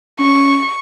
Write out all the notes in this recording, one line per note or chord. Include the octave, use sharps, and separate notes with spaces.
C#4 C#6